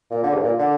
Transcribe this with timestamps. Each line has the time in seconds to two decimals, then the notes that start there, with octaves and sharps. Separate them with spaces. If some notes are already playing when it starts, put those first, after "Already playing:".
0.11 A#2
0.23 D3
0.33 G2
0.42 A#2
0.59 D3